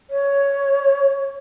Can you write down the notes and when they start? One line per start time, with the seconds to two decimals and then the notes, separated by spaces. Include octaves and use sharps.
0.10 C#5